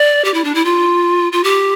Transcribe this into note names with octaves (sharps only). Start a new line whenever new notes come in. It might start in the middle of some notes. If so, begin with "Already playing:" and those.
Already playing: D5
G4
E4
D4
E4
F4
F4
G4